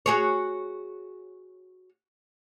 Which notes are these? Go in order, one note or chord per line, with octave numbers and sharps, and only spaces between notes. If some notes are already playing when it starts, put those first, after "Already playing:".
F#4 G#4 C#5